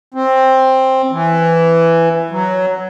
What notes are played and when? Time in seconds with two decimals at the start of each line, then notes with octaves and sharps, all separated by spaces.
0.14 C4
1.11 E3
2.31 F#3